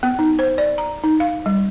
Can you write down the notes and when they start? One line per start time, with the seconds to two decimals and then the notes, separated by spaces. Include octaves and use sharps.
0.03 B3
0.19 D#4
0.39 C5
0.58 D5
0.78 A#5
1.04 D#4
1.20 F5
1.46 G3